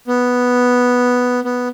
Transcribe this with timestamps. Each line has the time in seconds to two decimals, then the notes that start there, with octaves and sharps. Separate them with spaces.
0.07 B3
1.44 B3